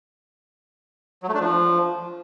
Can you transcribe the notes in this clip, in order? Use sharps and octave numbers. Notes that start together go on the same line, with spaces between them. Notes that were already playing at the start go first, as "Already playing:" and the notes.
F#3
A3
D4
F3